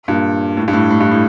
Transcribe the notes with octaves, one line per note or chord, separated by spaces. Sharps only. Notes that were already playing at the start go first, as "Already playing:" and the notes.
G2 A#2
A2
G2
A2
A2
G2
A2